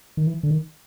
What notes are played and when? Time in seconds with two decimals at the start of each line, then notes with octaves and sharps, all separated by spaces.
0.17 D#3
0.27 E3
0.43 D3
0.51 D#3